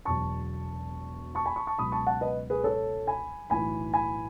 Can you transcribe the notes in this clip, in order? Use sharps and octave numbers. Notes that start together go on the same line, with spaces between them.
E1 E2 B2 F#3 A5 C#6
A5 C#6
G#5 B5
A5 C#6
A5 C#6
C#2 B2 F#3 B5 D#6
A5 C#6
F#5 A5
B4 D#5
G#4 B4
A4 C#5
G#5 B5
B1 A2 E3 G#5 B5
G#5 B5